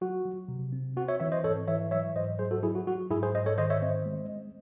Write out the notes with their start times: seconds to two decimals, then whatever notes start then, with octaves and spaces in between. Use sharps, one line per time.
0.01 F#3 F#4
0.25 F#3
0.48 C3
0.72 C4
0.97 C4 F#4
1.08 C#5 E5
1.20 E3 C#5 E5
1.32 C5 D#5
1.44 G#2 A4 C#5
1.67 E3 C#5 E5
1.91 F#3 C#5 E5
2.15 G#2 C5 D#5
2.39 F#3 G#4 C5
2.51 F#4 A4
2.63 F#3 E4 G#4
2.75 F#4
2.87 F#3 F#4
3.11 G#2 E4 G#4
3.23 G#4 C5
3.35 G#2 C5 D#5
3.46 A4 C#5
3.58 D#3 C5 D#5
3.70 C#5 E5
3.82 C4 C5 D#5
4.06 G#3
4.30 C4